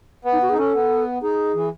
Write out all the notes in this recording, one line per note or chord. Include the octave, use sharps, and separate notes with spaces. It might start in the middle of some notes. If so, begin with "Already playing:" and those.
B3
D#4
F#4
G#4
D#4
C#4 A4
B3
D#4 G#4
E3